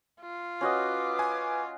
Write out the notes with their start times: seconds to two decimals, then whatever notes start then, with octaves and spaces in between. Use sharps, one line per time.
0.21 F4
0.61 C#4 F#4 B4 D#5 D6
1.19 G#5